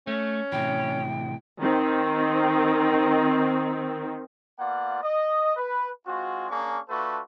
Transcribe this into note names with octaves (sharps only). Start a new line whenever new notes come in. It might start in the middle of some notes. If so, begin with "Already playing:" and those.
A3 C#4
A2 C3 E3 G5
D#3 C4
A#3 B3 F4 D5 F#5
D#5
B4
G#3 C4 F4 F#4
A#3 C#4 D4 G#4 A#5 C#6
A3 D4 F4 F#4 A4 B4